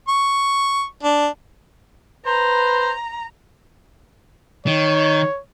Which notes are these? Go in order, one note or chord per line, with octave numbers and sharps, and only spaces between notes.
C#6
D4
B4 C5 A#5
D#3 C#5